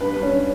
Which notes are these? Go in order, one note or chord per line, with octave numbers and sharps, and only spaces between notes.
G2 B4
G2
C#4 C#5